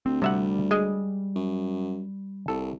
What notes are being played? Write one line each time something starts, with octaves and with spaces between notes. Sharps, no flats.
D2 C4
C3 G3 E5 F#5
G#3 G#4 D#5
F#2
C2 A4